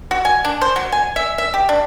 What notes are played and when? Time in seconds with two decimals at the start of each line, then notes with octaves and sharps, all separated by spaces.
0.11 F#4
0.25 G#5
0.45 D4
0.61 C5
0.76 F#3
0.92 G#5
1.16 E5
1.38 E5
1.54 G4
1.69 D4